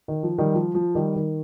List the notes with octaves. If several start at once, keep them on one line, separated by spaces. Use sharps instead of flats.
D#3
F3
D#3 G3
F3
F3
D#3 G3
D#3